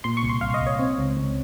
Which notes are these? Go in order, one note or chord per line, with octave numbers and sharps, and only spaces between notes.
A#2 C6
C#6
C2
C6
C2 F5
D#5
C2
C#5
C4
C#2
C#2